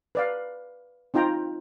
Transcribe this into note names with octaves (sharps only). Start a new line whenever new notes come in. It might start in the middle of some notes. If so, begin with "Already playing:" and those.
B4 D5 F5
C4 D#4 F4 G5 A#5